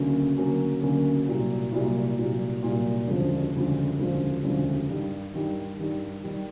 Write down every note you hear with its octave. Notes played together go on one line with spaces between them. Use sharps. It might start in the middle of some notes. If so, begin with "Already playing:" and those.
Already playing: D2 C#3 F#3 A#3 C#4
D2 C#3 F#3 A#3 C#4
D2 C#3 F#3 A#3 C#4
C2 A#2 F#3
C2 A#2 F#3
C2 A#2 F#3
C2 A#2 F#3
E1 D2 C#3 F3
E1 D2 C#3 F3
E1 D2 C#3 F3
E1 D2 C#3 F3
G2 D#3 G3
G2 D#3 G3
G2 D#3 G3
D#3 G3